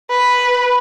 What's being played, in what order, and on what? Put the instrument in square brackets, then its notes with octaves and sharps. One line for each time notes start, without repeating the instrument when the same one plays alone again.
[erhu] B4